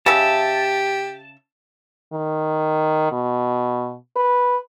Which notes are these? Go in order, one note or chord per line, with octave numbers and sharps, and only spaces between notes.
C#3 G4 E5 A5
D#3
B2
B4